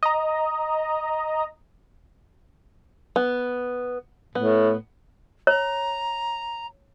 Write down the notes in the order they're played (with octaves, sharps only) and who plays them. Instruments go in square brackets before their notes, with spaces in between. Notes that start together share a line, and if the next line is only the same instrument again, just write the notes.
[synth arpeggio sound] D#5 A#5
[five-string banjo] B3
[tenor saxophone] A2 [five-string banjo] B3
[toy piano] C#5 [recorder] A#5